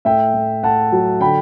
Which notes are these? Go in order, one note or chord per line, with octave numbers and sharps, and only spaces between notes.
A2 E5 G5
A2
A2 F#5 A5
F#3
D3 G5 B5